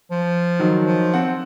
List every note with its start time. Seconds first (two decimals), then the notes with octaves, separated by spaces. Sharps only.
0.11 F3
0.59 D#3 F#3
0.84 F3
1.14 C4 F#5